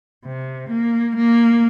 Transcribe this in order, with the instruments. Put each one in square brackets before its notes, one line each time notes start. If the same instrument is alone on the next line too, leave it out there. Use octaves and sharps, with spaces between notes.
[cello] C3
A#3
A#3